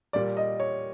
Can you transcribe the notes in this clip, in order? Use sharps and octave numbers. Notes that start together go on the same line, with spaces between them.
A#2 G3 D5
D#5
C#5